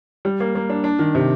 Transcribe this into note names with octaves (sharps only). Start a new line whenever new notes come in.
G3
A#3
A#3
D4
D4
D#3
C3